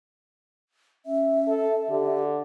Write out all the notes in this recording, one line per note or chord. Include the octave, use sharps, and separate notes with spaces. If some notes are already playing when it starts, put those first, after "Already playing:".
C#4 E5
A4
D3 G4